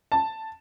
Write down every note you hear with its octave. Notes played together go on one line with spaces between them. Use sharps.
A5